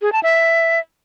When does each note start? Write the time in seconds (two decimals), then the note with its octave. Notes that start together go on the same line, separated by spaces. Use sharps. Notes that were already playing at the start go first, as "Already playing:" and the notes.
0.02 G#4
0.12 A5
0.23 E5